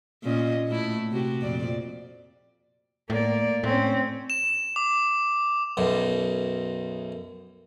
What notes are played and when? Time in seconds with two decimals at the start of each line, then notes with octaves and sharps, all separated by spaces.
0.24 A#2 C#4 D#5
0.69 A2 A3 E4
1.11 C3 F#4 G4
1.42 F2 A#2 D5
3.10 A2 A#3 D5
3.64 A2 C4 C#4
4.30 E7
4.76 D6
5.77 B1 F#2 B2